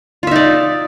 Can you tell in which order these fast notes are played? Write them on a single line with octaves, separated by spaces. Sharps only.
F4 E5 D#4 D5